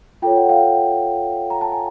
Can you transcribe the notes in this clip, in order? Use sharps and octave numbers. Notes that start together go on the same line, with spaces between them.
F4 A4 C#5 G5
F#5
F5 G5
A#5
A5
G#5